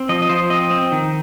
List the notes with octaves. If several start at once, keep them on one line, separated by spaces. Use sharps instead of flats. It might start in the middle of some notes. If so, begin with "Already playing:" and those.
Already playing: C4
F3 D#5
D#5
F3 C5
C4 D#5
C4
D#3